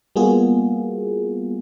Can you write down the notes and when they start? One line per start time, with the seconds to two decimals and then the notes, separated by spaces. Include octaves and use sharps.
0.16 G3 A#3 B3 F4 F#4 G#4